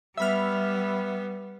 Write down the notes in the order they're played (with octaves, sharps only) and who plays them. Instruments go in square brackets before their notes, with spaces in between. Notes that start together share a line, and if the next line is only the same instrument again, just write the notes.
[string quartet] G3 B3 [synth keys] E5 B5 F6